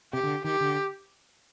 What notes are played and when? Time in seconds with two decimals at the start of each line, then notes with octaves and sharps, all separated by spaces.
0.13 C3 G4
0.23 D3
0.44 D#3 G4
0.60 D3